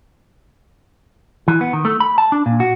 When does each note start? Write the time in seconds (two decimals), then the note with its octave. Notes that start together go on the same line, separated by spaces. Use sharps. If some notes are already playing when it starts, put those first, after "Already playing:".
1.48 E3
1.61 B3
1.73 D#3
1.85 A3
2.00 B5
2.18 A5
2.32 D4
2.46 A#2
2.60 F#4